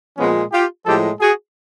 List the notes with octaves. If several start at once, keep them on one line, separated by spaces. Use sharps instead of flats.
A#2 F3 G#3 B3 C#4
F4 G4
A2 F3 G#3 G4 A4
F#4 G#4